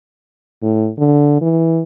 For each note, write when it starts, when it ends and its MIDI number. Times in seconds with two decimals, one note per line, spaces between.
0.62 0.90 45
0.98 1.40 50
1.41 1.82 52